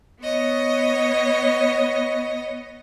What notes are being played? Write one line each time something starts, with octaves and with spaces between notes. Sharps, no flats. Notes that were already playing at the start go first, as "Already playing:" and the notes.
B3 C#5 D#5